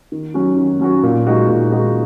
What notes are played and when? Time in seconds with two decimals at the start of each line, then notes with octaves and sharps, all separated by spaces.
0.12 D#3
0.34 F#3 C#4 F#4
0.57 D#3
0.80 F#3 C#4 F#4
1.03 A#2
1.27 G#3 D#4 F#4
1.49 A#2
1.72 G#3 D#4 F#4